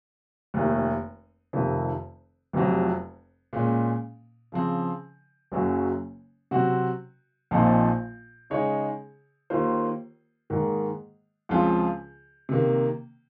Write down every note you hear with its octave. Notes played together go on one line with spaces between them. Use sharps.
F1 D#2 D#3
F1 F2 C3 D#3
F1 F2 C3 F#3
A#2 G#3 C#4
C#3 F3 C4
F#1 F#2 C#3 F#3 C#4
C3 F#3 C4 F#4
A#1 A#2 F3 C4 D#4
C#3 G#3 D#4 G#4 C#5
D#2 D#3 A#3 F4 C5
G#2 D#3 A#3
C#2 C#3 F3 C4 F4
C3 D#3 A#3